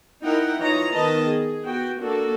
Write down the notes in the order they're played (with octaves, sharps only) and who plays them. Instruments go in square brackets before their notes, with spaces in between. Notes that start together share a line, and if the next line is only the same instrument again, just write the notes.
[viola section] D#4 E4 A#4 F#5 G5
E3 D#4 F4 C#5 D#5 A#5
D#3 B3 B4 D#5 A5
G#4
B3 F#4 G5
A#3 D4 F#4 A4